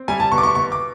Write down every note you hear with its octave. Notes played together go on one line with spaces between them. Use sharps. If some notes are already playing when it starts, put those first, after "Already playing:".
Already playing: C4
G3 G#5
A5
B2 C#6
D6
C#6
B2 C#6
D6